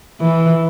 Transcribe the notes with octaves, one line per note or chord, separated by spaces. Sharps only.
E3